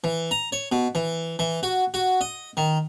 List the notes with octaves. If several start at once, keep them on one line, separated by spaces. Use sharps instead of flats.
E3
A#5
C#5
B2
E3
E3
F#4
F#4
D#5
D#3